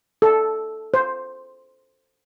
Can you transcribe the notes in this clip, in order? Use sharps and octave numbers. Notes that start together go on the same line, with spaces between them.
A4
C5